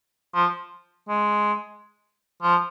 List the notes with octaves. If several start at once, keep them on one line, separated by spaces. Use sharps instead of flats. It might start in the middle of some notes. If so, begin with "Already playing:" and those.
F3
G#3
F3